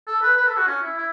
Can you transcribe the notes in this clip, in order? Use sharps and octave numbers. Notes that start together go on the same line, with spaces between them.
A4
B4
B4
A4
F#4
C#4
E4
E4